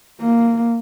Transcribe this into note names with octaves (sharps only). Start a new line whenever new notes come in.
A#3